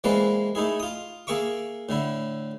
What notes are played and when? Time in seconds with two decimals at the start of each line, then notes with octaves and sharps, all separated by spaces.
0.04 E3 G#3 A#3 C4 B4 D5
0.55 A3 D#4 E4 G#4
0.80 F4 D#6
1.27 A#3 G#4 E5 C#6 D6
1.89 A2 D3 E4